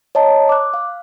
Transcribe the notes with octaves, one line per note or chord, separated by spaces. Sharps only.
C#5 D#5 A5 A#5
D6 F#6
F5